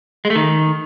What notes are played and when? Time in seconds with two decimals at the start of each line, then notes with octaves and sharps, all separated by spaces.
0.25 G#3
0.30 A3
0.36 D#3